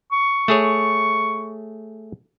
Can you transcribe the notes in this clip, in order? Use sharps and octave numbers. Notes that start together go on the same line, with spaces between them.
C#6
A3 G#4 C#5